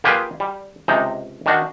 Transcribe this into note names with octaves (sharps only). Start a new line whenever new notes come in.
A#3 F4 G4 G#4 B4
G3
C#2 C3 D#4 A#5
D#3 D4 F#4